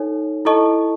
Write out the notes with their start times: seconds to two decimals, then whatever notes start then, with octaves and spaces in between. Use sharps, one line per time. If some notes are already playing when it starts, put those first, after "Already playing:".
Already playing: D#4 A4 C#5 G#5
0.45 E4 A4 D#5 A5 C#6